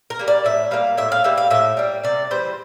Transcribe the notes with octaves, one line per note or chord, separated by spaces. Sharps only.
A#4
G3 A#3
D5
A2 E5
G3 A#3 F5
A2 E5
F5
G3 A#3 E5
F5
A2 E5
G3 A#3
C3 D5
E3 G3 C5